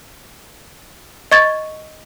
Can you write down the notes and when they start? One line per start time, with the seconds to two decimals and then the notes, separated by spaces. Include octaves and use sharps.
1.32 D#5 C#6 G#6 A6